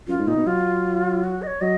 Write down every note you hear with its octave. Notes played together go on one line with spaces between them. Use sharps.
F#2 F4
G#2
A#2 D#4
B2
F#3 F4
F#4
D#5
C#5
F#3 D#5